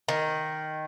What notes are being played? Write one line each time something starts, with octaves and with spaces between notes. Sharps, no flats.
D#3